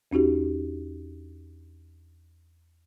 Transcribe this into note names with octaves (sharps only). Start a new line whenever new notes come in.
E2 C#4 D#4 F#4 G4